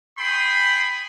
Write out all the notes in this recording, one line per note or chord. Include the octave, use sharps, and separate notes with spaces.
G#4 G5 B5 C6